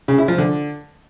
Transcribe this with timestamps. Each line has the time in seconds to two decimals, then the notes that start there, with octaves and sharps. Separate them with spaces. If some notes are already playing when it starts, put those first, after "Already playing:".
0.08 C#3
0.18 E4
0.28 F3
0.38 D3